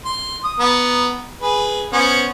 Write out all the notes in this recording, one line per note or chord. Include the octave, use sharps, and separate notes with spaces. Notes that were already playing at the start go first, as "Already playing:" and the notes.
C6
D#6
B3 A#5
G#4 B4
B3 C#4 C5